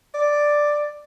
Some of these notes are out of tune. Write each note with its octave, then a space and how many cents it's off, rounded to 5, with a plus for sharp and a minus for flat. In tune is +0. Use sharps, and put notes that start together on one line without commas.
D5 +5